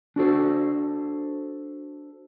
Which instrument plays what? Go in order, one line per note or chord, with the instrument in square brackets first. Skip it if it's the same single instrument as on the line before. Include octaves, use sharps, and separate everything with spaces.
[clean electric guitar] D4 F#4 A4 C5